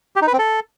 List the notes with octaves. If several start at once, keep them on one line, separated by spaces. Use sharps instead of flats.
G4
D#4
B4
C4
A4